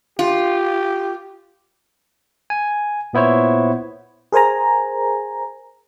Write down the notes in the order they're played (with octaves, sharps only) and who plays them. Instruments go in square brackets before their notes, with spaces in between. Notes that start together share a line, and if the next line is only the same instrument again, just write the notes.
[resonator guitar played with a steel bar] F4 [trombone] G4
[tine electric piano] G#5
A#2 B3 E4 C5 C#5
[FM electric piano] G#4 A#4 C5 G#5 A#5